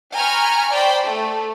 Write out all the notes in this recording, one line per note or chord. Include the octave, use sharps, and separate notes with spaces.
G5 G#5 A#5 B5 C#6 F6
C5 D5 G5 B5
A3